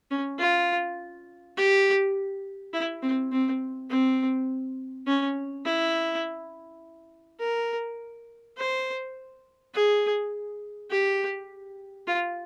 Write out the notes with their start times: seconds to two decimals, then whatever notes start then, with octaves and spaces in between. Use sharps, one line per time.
0.11 C#4
0.39 F4
1.57 G4
2.73 E4
3.02 C4
3.32 C4
3.90 C4
5.07 C#4
5.65 E4
7.40 A#4
8.58 C5
9.74 G#4
10.91 G4
12.07 F4